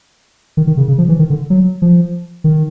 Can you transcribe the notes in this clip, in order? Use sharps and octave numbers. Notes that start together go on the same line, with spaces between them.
D#3
D#3
C#3
C#3
F3
E3
D#3
D3
F#3
F3
D#3